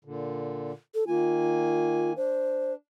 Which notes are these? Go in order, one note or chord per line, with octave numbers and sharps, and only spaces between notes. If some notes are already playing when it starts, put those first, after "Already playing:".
A#2 D3
A4
D#3 A#3 F4 G#5
D4 C5